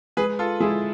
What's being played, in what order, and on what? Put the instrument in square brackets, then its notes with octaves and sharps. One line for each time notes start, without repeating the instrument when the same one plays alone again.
[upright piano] G#3 [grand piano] G#4 B4
[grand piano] F4 A4
[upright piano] G#3 [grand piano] E4 G#4